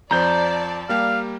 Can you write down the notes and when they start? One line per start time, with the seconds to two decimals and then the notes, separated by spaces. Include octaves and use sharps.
0.11 F2 F3 C5 D5 A5 A#5 G6
0.89 G3 A#3 G4 F5